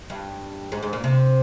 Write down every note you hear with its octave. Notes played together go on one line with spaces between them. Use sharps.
G2
G#2
G#2
A#2
C3